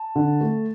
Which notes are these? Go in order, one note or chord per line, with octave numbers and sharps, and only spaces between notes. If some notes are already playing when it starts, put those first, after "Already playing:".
Already playing: A5
D3
A3